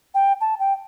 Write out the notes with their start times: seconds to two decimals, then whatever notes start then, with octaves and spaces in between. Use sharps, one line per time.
0.14 G5
0.41 A5
0.60 G5